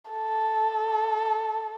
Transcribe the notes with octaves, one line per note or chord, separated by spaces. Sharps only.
A4